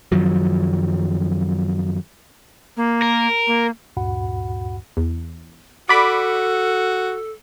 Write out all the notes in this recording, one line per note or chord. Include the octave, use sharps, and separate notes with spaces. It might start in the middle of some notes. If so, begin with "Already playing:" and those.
F#2 D#3 F3 F#3
A#3
A#4
A#3
D2 G2 A#2 F#4 F#5 B5
E2
F#4 A4 D5 B5 D6